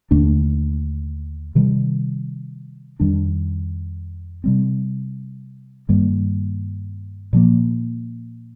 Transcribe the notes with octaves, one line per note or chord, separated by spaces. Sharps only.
D#2 D3 A3 D4
C3 D#3 G3
F2 D#3 G3 D4
C3 G3 C4
G2 D#3 G3 A#3
A#2 F3 A#3